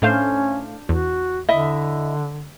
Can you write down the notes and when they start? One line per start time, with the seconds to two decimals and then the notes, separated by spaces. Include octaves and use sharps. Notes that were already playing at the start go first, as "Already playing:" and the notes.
0.02 A2 A3 C#4 D4 C5 F5
0.89 E2 F#4
1.49 D3 E4 D#5 E5